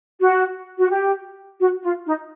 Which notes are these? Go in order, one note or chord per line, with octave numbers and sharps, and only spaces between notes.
F#4
F#4
G4
F#4
F4
D#4